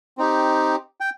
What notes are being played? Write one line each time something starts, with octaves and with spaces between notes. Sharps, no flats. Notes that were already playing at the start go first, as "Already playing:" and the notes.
C4 D#4 G4
G5